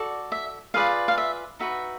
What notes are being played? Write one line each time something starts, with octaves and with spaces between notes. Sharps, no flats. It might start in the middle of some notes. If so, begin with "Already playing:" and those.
Already playing: F#4 A4 D5
E5
F4 G#4 B4 D5 F5
F5
E5
D#4 F#4 B4 E5